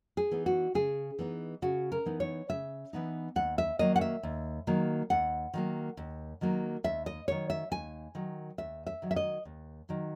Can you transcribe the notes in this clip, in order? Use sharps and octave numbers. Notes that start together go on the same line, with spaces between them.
G#4
E3 B3 D#4
F#4
C#3 G#4
E3 B3 D#4
C#3 F#4
A#4
E3 B3 D#4
C#5
C#3 E5
E3 B3 D#4
D#2 F#5
E5
D#3 F#3 A#3 D#5
F#5
E5
D#2
D#3 F#3 A#3
D#2 F#5
D#3 F#3 A#3
D#2
D#3 F#3 A#3
D#2 E5
D#5
D#3 F#3 C#5
E5
D#2 G#5
D#3 F#3
D#2 E5
E5
D#3 F#3
E5
D#5
D#2
D#3 F#3